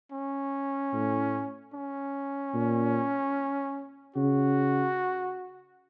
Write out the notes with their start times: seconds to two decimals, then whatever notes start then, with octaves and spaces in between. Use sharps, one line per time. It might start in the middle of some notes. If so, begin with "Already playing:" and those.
0.12 C#4
0.93 A2
1.74 C#4
2.54 A#2
4.16 C#3 F#4